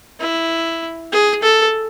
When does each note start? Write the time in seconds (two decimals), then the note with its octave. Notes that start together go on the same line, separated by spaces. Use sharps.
0.20 E4
1.12 G#4
1.43 A4